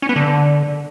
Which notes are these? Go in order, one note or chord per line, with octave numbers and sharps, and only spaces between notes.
C#4
B3
D3